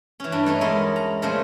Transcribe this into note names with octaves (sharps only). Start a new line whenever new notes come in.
E3 C#4
G2 D4
A3 C#4 D#4
E2 G#3 E4 A4 A#4 D#5
A#5
A#2 C#3 F3 A3 C5 G#5